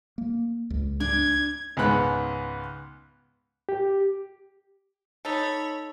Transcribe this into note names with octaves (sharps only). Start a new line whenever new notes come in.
A#3
C#2
D4 G#6
C#2 G#2 B3 B5 F#6
G4
D#4 A4 C#5 B5